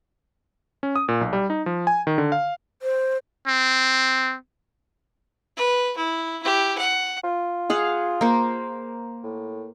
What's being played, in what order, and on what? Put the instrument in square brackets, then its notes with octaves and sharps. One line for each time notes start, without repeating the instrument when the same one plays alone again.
[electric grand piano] C#4
D#6
A#2
B1
G3
D#4
F3
G#5
D#3
D3
F5
[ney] C5
[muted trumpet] C4
[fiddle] B4
E4
E4 G4
F#5
[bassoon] F4
[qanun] G#4 F5 F#5
A#3 C5
[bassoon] A2